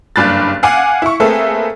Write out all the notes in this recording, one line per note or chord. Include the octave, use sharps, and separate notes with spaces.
F#1 G2 D4 B5 F#6 A6
F5 F#5 G#5 D6
E4 C#6
A3 A#3 C4 G#4 A4 B4